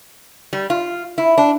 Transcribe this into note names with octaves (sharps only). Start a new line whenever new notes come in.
G3
F4
E4
D4